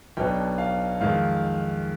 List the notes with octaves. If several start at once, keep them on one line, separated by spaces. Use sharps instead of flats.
B1 B2 B3 D4 G5
F5
F2 D#3 G#3 F5